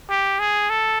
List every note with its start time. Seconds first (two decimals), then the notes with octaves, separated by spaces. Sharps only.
0.10 G4
0.39 G#4
0.70 A4